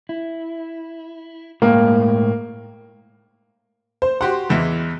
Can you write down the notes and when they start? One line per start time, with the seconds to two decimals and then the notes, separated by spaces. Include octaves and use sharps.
0.09 E4
1.62 A2 G#3 A#3 G5
4.02 C5
4.21 F#4 G4 F#5 C6
4.49 E2 E3 G#3